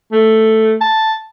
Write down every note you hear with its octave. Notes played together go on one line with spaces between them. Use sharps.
A3
A5